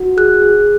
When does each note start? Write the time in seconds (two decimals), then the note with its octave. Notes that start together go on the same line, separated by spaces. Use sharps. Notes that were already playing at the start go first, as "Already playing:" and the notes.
Already playing: F#4
0.17 G#4 F#6
0.42 G#4